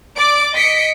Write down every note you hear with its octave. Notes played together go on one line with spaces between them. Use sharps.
D5 D6 D7
D#5 B6 C#7 D7